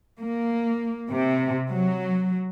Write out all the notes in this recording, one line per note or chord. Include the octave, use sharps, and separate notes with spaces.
A#3
C3
F#3